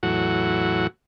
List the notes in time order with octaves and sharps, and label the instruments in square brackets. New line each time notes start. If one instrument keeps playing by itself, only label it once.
[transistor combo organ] E2 A2 F#3 F#4